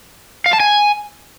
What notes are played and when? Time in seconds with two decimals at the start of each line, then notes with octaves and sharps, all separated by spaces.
0.46 F5
0.53 A5
0.60 G#5